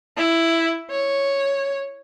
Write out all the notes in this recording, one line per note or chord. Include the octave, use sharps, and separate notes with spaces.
E4
C#5